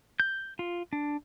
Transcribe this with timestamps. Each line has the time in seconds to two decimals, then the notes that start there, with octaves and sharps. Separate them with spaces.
0.20 G6
0.59 F4
0.93 D4